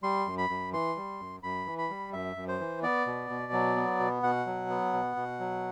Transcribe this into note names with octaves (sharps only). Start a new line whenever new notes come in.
G3 C6
F#2
B5
F#2
E3 C6
G3
F#2
F#2 B5
E3
B5
G3
F#2 E5
F#2
C5
E3
B3 D5
B2
B2
F#3
B3
B2
B2 F#5
F#3
B3
B2
B2
F#3